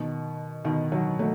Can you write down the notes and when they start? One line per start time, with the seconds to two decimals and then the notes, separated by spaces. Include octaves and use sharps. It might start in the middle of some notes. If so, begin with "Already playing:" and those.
Already playing: B2 D#3
0.65 B2 D#3
0.92 D#3 F#3
1.19 F#3 A3